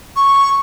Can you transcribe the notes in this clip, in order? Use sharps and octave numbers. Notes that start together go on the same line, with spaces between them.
C#6